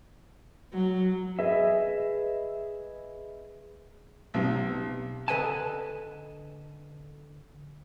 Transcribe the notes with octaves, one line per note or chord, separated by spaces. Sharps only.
F#3
G#4 B4 D#5 E5
B1 C3
D3 A4 B4 D#5 G#5 A5